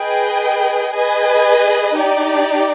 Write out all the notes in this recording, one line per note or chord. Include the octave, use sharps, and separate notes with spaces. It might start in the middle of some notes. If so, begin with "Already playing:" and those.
Already playing: G#4 B4 D#5 G5
G#4 B4 D#5 G#5
D#4 G4 D5